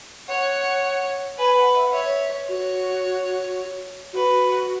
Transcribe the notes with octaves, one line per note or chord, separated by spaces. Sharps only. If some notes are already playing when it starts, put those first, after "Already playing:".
C#5 F#5
B4 G#5
F#5
E5
F#5
C#5 E5
F#4 C#5
F#4 B4